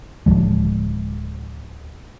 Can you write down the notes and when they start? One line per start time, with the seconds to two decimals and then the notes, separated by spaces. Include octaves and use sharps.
0.26 D1 C#2 F3 G#3